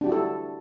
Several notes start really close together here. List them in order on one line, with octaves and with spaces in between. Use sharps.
D4 G4 F#4 E4 A4